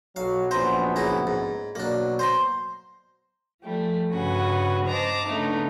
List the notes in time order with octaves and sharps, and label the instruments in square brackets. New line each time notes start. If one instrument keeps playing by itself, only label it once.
[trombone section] B1 F#3 F#4 [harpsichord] F5
[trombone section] A#1 F#2 B3 [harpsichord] C5 A#5
[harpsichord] C#2 E4 A#5
G#2
[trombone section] B2 F#3 [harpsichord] A#3 D4
[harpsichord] C5 A#5 C6
[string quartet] F3 G3 A3
G2 C#3 F#4 B4 F#5 G#5
C5 D#5 A5 A#5 D6
C#3 A3 B3 D4 D#4